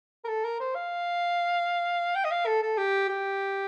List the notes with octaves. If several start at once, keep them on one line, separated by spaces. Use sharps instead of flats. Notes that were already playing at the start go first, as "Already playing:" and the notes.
A#4
A4
A#4
C5
F5
G5
D#5
F5
A4
A4
G4
G4